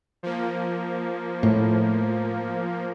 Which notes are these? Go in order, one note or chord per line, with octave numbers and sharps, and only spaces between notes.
F3 A#3
A2